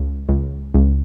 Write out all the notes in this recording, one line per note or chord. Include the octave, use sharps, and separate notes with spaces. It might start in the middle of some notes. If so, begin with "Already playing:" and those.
Already playing: C#2
C#2
C#2